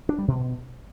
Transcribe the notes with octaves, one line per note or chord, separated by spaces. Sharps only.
D4
G3
B2